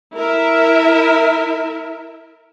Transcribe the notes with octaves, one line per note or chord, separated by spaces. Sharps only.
E4 A#4 E5